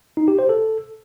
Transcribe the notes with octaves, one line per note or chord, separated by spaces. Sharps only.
D#4
G4
C5
A4